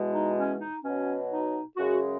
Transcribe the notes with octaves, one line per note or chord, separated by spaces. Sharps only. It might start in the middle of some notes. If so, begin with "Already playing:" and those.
Already playing: E2 B2 G#3
D#4
C#4
D#4
B2 F#3 C#4
D#4
F#2 C#3 G#3 F#4